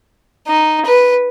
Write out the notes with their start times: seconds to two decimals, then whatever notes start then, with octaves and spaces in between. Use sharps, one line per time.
0.47 D#4
0.85 B4